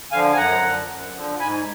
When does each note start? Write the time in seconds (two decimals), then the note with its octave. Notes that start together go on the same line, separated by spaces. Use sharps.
0.11 D3 F3 F5 G#5
0.33 G#5
0.37 F#2 F#5 A#5
0.63 D3 F3
0.89 F#2
1.14 D3 F3
1.40 G#2 G#5 B5